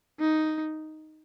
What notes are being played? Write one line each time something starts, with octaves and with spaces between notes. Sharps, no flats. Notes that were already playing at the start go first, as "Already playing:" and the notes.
D#4